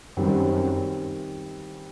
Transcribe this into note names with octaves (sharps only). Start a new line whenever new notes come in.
F#2 D#3 G3 C4